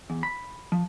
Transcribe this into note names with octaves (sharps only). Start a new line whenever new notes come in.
E2
B5
F3